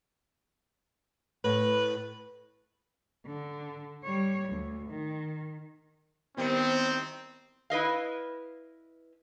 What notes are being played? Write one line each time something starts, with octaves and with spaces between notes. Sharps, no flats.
A2 B4
D3
G3 C#5
D2
D#3
D#3 G3 B3 C4 E4 C5 C#7
E4 B4 D#5 F5